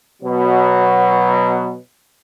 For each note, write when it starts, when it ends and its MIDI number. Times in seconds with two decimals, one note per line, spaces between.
0.22 1.75 47
0.22 1.75 54